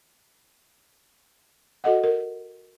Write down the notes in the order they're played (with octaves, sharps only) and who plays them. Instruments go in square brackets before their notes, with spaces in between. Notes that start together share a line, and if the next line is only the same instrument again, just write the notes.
[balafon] F#4 A4 D#5 F#5
A#4